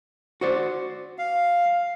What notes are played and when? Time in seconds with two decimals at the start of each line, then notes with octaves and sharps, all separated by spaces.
0.41 F#4 C5 D5
1.18 F5